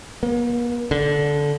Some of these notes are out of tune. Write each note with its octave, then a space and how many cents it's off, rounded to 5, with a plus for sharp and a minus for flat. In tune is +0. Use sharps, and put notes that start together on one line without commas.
A#3 +45
D3 -15